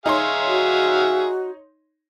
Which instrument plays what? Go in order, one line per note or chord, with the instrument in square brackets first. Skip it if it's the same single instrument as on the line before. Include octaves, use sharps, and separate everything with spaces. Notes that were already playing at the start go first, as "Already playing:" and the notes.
[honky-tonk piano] D#4 C#5 C6 [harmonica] G#4 E5 F5
[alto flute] F#4